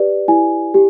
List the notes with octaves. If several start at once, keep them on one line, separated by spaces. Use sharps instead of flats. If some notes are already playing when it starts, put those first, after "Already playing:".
Already playing: G4 B4 D5
E4 G#5
G4